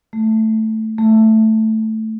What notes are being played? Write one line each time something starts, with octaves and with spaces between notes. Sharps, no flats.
A3
A3